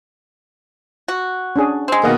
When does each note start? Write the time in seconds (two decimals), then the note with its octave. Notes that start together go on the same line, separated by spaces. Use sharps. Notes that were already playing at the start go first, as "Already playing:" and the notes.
1.08 F#4
1.56 C#4 D4 G#4
1.88 G#3 C4
2.03 B2 D#3 A#3 G#4 D#5 F#5